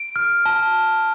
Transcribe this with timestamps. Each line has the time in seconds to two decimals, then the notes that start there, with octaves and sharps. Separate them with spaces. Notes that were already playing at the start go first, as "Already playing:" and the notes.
Already playing: D7
0.16 F6
0.46 A5